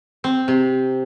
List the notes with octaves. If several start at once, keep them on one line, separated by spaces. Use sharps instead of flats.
C4
C3